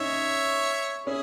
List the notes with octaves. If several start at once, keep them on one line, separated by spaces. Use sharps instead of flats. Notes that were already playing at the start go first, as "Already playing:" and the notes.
Already playing: C#4 D#4 C#5 E5
C#4 E4 G#4